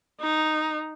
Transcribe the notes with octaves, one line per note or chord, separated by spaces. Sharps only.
D#4